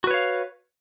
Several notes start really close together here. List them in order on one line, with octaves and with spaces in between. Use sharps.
F#4 B4 C#5 F5